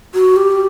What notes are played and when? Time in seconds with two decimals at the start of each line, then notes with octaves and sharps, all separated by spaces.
0.14 F#4
0.36 G4